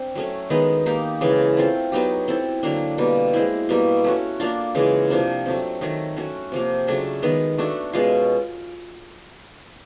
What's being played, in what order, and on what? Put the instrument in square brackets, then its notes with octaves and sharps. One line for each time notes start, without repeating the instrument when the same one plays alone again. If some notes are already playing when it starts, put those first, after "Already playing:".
Already playing: [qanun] C4 D4
F#3 A3 C#4
D#3 G#3 B3 D#4
A#3 D#4 G4
C#3 E3 G#3
A3 C4 F4
F#3 B3 D#4 G4
C4 E4 A4
D3 F#3 A#3 D4
B2 G3 A#3
G#3 C4 E4
B2 G3 A#3
A3 C#4 F#4
A#3 D4 F4
C#3 E3 G#3
C3 F3 A#3 D4
F#3 A3 C4
D#3 F#3 A3
A3 C#4 F#4
C3 F3 A#3
C#3 F#3 A3 D4
D#3 G#3 B3
A3 D4 F#4
B2 G#3 C#4 F4